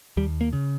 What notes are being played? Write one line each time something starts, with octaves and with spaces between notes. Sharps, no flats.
D#2 G3
A#3
C#3